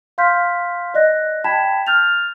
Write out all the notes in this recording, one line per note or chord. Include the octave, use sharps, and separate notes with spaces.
F5 C6 F6 G6 B6
D5 D#5 F#6 A#6
G5 A5 B5 G#6 B6 E7
F6 G6 A6 F7